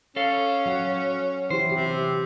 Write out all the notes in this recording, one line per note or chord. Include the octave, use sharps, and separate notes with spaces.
C#4 A4 F5
F#3 F#5
E3 E4 G4 C5
C3 G4